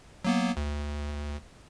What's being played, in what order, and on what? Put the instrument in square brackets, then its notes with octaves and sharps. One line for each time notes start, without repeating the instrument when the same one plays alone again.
[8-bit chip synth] F#3 A#3 B3
D2